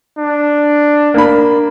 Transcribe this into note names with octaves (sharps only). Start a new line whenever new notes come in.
D4
A#3 D4 B5